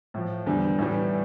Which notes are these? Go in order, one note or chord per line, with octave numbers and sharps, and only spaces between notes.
A2 F3
E2 D3 G3
A2 E3 G3